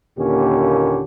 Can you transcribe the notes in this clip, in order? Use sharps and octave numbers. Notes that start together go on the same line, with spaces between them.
D#2 A#2 D3 C#4 G4